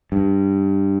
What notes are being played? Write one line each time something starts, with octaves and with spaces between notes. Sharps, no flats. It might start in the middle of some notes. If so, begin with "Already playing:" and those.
G2